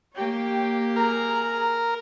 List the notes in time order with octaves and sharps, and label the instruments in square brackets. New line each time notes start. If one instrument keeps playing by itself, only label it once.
[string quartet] A#3 G4 [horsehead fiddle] C#5 G5
[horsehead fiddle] G#4 A#5 [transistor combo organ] A#4